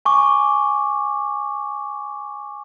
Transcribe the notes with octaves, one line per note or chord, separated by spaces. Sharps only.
G#5 C#6 D6